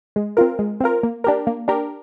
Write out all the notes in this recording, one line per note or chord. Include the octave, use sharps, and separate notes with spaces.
G#3
C4 F4 A#4
G#3
C4 F4 A#4
A#3
D4 G4 A#4
A#3
D4 G4 A#4